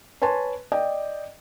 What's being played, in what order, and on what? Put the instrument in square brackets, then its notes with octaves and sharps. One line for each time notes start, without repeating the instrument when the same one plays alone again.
[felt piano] B4 C#5 G#5 A5 C6
D5 D#5 G5